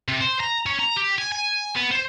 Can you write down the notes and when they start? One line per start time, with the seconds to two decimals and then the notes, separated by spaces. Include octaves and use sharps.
0.08 C3
0.21 C5
0.40 A#5
0.66 C#4
0.80 A#5
0.97 G4
1.18 G#5
1.32 G#5
1.76 B3
1.91 C5